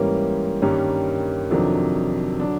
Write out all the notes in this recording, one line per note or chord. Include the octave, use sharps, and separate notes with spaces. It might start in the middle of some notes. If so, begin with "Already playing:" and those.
Already playing: G#2 E3 G3 A#3 C#4
G2 D#3 G3 A#3 C#4
F2 C3 D#3 F#3 D4
D3 F#3 D4